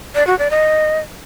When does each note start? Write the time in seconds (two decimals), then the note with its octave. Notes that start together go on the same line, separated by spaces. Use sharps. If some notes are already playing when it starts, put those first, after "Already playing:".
0.15 D5
0.27 F#4
0.39 D5
0.51 D#5